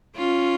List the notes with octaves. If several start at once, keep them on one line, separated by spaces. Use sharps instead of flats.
C#4 F4